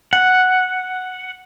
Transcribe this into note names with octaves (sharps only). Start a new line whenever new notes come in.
F#5